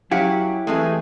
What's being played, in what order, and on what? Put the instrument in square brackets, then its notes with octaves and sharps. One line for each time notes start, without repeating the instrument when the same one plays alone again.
[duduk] F#3 [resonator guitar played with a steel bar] C#4 F5 F#5 [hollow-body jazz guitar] E4 G4
[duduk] E3 [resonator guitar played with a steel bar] G#3 C4 G#4 [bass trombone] A3